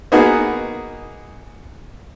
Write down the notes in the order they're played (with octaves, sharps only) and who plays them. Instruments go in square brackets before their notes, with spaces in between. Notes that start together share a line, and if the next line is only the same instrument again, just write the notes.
[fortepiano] A#3 B3 D#4 F#4 G#4